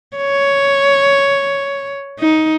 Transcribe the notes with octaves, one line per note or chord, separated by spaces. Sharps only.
C#5
D#4